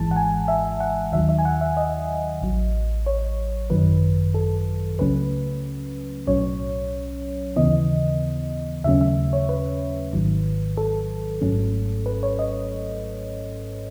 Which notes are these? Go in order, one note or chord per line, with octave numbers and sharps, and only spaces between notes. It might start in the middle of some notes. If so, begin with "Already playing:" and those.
Already playing: G#1 G#2 E3 G#3 A5
F#5
G#5
E5
F#5
D#2 D#3 F#3 E5
E5
G#5
F#5
E5
D#5
A1 A2 F#3
C#5
G#1 F#2 D#3 F#3 B4
A4
C#2 C#3 F#3 A3 C#4 B4
B1 A2 F#3 C#4 C#5
D#2 C#3 E3 B3 D#5
D#2 C#3 F#3 A3 C#4 E5
E5
C#5
B4
G#1 G#2 D#3 F#3
A4
G#1 G#2 F#3 A3 C#4
B4
C#5
D#5